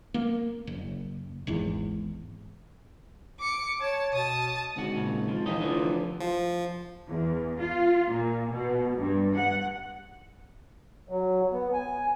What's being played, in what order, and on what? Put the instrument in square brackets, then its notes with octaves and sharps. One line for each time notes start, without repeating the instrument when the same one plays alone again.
[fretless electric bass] A#3
F#1
G#1 E2
[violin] D6 C#7
[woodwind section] C#5 [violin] A5
[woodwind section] B2 [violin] A5 D#6
[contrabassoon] G#1 [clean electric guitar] D2 F#4
[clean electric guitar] A#2 C#3
F3
[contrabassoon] F1 [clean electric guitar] E3 D#4 D#5
[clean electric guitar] D3 E3 F3
[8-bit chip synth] F3
[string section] E2
F4
A#2
B2
G2
F#5
[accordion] F#3
B3
G#5